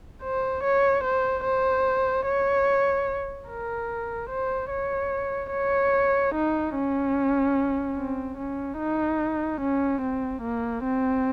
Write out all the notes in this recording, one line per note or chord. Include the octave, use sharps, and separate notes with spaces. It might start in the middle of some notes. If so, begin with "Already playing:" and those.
C5
C#5
C5
C5
C#5
A#4
C5
C#5
C#5
D#4
C#4
C4
C#4
D#4
C#4
C4
A#3
C4